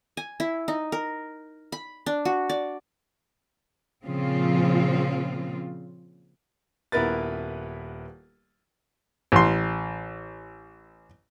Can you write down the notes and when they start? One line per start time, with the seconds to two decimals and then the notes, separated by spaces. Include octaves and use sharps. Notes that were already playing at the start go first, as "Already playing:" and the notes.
0.17 G#5
0.40 E4
0.68 D#4
0.92 A#4
1.72 B5
2.06 D4
2.25 F#4
2.49 D5
4.05 A#2 C#3 F3 C4 F4
6.92 D#1 B3 E4 A#4 B4 A6
9.32 A1 C6